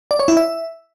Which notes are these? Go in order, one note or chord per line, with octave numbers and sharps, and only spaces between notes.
D5
C#5
E4
E5